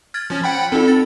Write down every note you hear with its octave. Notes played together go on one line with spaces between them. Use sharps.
F6 G#6 A6
F3 C#4
F#5 G5 B5
C4 D#4 F4 A4
A6